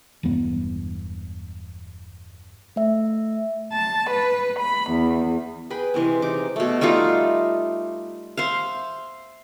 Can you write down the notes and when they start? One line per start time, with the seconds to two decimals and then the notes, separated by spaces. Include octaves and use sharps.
0.23 E1 E2 G2 B3
2.76 A3 E5
3.73 A5
4.10 B4
4.60 B5
4.91 E2
5.70 G#4 B4 G5 B5
5.94 C3 E3 G#3 C4
6.22 E3 D#4 D6
6.56 B2 A3
6.81 G3 A3 D#4 F4
8.37 C5 E5 F5